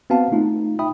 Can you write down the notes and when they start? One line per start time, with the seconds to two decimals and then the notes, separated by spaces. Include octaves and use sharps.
0.10 B3 C4 F#4 F5 A5
0.32 A3 D#4 F4
0.79 E5 G5 B5 D#6